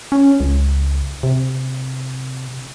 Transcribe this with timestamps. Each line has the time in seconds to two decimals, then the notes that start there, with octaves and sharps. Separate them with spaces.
0.12 C#4
0.40 C#2
1.23 C3